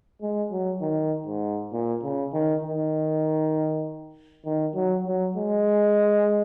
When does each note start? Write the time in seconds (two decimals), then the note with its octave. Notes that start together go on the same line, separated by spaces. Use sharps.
0.22 G#3
0.51 F#3
0.81 D#3
1.27 G#2
1.72 A#2
2.03 C#3
2.33 D#3
2.63 D#3
4.45 D#3
4.75 F#3
5.07 F#3
5.36 G#3